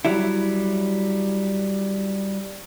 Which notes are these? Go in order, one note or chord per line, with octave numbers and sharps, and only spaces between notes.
F#3 G3 E4